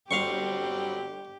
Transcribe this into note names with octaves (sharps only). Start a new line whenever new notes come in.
G1 F#3 G3 C4 G4 F5 C6 C#6